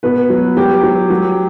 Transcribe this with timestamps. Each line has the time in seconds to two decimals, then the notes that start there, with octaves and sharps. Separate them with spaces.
0.03 B2 B4
0.30 F#3
0.57 F#3 G4
0.83 F#3
1.10 F#3